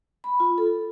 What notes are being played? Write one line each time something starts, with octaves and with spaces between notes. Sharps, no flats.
B5
F4
A4